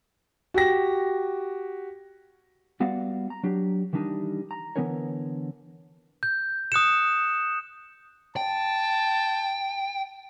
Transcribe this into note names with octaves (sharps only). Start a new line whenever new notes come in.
F#4 G4 A#6
G3 B3 F#4 D5 F5 F#5
A#5
F#3 D4 G4
D#3 E3 G3 D4 D#4
A#5
D3 E3 B3 C#4 A#4 C#5
G6
D#6 F#6 C#7 E7
G5 A5